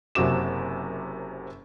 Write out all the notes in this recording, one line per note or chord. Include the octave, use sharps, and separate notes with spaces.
F#1 F#2 C3 F#4 D6 E7